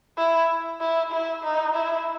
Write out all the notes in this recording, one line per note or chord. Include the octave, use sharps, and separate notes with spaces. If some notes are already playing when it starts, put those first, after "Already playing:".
E4
E4
E4
D#4
E4